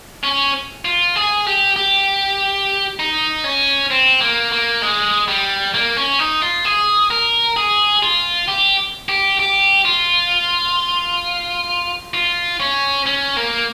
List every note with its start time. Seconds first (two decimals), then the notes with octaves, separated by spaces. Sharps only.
0.24 C#4
0.85 F4
1.16 G#4
1.47 G4
1.76 G4
2.99 D#4
3.44 C#4
3.91 C4
4.21 A#3
4.52 A#3
4.82 G#3
5.28 G3
5.74 A#3
5.97 C#4
6.19 D#4
6.42 F4
6.65 G#4
7.10 A#4
7.57 G#4
8.03 F4
8.48 G4
9.09 G4
9.40 G4
9.85 F4
12.14 F4
12.60 C#4
13.06 C#4
13.37 A#3